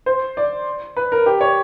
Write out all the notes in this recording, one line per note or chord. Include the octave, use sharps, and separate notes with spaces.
C5
D5
B4
A#4
G4
C#5